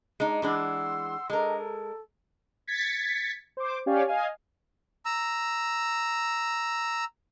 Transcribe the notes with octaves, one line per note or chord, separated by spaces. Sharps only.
G#3 D4 D#4
E3 G#3 D4 F#5 C6 E6
G#3 D4 A4 A#4 D#5
A4
G#6 A6 B6 C#7
C5 D6
C#4 G4 C#5 D5 F5 G#5
D#5 F5 G#5
A#5 E6